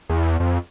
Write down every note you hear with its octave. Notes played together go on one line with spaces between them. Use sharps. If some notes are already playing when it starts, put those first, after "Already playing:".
E2
F2